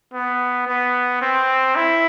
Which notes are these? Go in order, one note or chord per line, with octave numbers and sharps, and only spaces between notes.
B3
B3
C4
E4